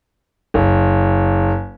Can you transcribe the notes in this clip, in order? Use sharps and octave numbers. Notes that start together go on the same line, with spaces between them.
F#1